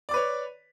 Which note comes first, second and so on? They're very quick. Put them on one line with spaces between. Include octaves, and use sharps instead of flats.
D5 D6 B4 C#5